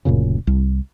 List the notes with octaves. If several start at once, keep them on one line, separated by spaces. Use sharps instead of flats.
D1 F#2 A#2 C#3
C2